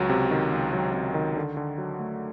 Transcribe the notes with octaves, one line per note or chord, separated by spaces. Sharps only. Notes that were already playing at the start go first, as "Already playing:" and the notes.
Already playing: C#2 F#3
C3
D#3
C#2
F#3
C3
D#3
D3
D3
F#3
A3